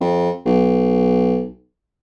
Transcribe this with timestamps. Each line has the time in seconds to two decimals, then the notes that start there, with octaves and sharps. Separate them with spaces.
0.01 F2
0.45 B1